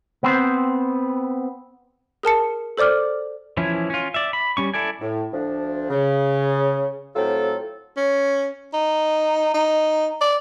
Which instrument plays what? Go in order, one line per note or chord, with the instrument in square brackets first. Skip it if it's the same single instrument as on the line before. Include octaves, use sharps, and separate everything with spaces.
[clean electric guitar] B3 C4 C5
[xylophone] G#4 A#4 A5 C#7
A4 C5 D5 D6 F6
[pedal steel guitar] E3 F3 C#4 E4
C#4 F4
D5 E5
B5
G3 C#4 C#6
E4 A4 D5 G#5
[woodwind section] A2
D2 F3 D4
C#3
A2 F#3 C4 F4 A4
[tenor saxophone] C#4
D#4
D#4
D5